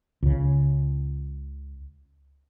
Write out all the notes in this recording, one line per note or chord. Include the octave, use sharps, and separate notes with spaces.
C#2 C#3